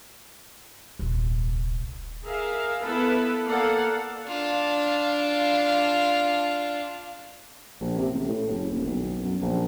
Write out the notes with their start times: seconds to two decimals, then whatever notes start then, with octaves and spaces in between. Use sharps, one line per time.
0.99 D#1 C2
2.24 G#4 A#4 E5 F5
2.82 B3 E4 A4 B4
3.48 A#3 A4 D5 F5 F#5
4.26 D4 F4
7.81 A#1
7.98 C3
8.13 A1
8.28 A2
8.50 F#1
8.71 D#1
8.86 B1
9.24 F#2
9.41 A#1